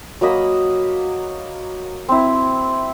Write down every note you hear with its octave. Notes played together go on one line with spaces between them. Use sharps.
F#3 A#3 D#5 B5
C4 E4